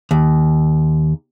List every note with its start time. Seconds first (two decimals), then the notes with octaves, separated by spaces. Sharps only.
0.11 D#2